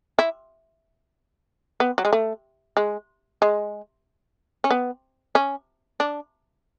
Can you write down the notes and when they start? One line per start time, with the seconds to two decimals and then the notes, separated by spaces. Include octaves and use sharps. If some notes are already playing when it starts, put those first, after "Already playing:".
0.19 E4
1.80 B3
1.98 F#3
2.05 G#3
2.13 A3
2.77 G#3
3.42 G#3
4.64 C#4
4.71 B3
5.35 C#4
6.00 D4